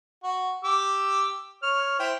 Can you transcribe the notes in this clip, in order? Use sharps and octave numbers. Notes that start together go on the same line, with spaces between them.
F#4
G4 D6 E6
C#5 F6
E4 C5 G5